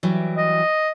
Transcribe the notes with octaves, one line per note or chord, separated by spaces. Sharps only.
E3 F#3 G3
D#5